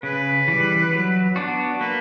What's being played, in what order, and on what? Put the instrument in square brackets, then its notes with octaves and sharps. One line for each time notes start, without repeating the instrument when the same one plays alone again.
[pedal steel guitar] C#3 [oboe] B4
[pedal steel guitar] E3 G3
F#3
B3 D4 F#4
[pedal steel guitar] A#3 [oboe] B4